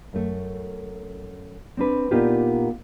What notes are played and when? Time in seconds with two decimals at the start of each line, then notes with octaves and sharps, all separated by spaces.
0.13 F#2 A3
1.77 C4 D4 B4
2.11 A#2 B3 D4 D#4 F4 G4